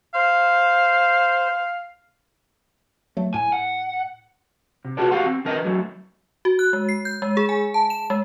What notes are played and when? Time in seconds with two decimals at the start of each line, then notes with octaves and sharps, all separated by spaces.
0.14 C5 F5
3.17 F#3 A3
3.34 A2 G#5
3.53 F#5
4.85 C3
4.97 F4 F#4 G#4 A4 B4 D5
5.11 E2 F#4 G4 F5 F#5 C6
5.26 C4
5.45 D3 E3 A#4 B4 D#5
5.64 F#2 F#3 A3 C#4
6.45 F#4
6.59 F#6
6.73 G#3
6.89 C7
7.05 G6
7.22 G#3
7.37 G#4
7.49 G#5
7.74 A5
7.90 E7
8.10 G#3